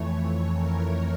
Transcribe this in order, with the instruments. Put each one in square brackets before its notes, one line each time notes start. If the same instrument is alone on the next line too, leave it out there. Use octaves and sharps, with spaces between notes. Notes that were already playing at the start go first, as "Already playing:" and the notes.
Already playing: [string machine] F2 E3 A3 C#5
A#4